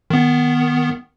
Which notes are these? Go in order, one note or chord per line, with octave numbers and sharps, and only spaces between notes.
D#3 B3